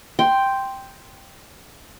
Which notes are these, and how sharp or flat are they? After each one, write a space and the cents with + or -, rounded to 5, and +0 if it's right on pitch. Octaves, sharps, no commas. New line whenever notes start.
G5 +0 C6 +0